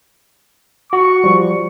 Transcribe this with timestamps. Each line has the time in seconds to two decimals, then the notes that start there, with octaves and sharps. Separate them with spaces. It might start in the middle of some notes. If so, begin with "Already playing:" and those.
0.93 F#4 C#6
1.24 F3 G3